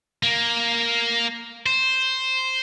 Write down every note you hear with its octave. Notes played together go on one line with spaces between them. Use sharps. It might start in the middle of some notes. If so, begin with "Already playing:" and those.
A#3
C5